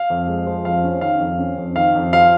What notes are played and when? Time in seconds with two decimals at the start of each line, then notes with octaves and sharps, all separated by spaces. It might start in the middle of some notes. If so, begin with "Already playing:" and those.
Already playing: F5
0.10 F2
0.28 G#3
0.47 F3
0.65 F2 F5
0.84 C#4
1.01 D#3 F5
1.20 F2
1.39 C#4
1.57 F2
1.75 D#3 F5
1.95 F2
2.13 F3 F5